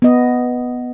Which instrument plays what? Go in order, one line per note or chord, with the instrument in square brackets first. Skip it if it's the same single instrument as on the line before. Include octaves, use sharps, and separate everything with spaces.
[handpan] B3 D#5